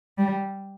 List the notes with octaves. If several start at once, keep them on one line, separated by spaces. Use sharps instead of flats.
G3